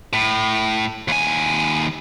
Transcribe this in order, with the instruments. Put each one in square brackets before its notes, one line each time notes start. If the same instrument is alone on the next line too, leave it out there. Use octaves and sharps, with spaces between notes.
[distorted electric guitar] A2
D#2 G#5